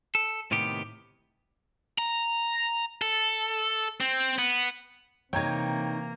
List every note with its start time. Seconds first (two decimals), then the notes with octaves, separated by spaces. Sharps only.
0.15 A4
0.51 A2 C3 D#3 B3 G4
1.99 A#5
3.02 A4
4.00 C4
4.38 B3
5.33 C3 E3 A#3 D#4 C#5 G5 A#5 G#6